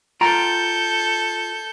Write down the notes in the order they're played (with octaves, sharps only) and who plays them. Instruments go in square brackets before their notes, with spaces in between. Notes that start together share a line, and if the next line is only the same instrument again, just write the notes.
[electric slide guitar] F4 G5 A#5 [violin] A4 G6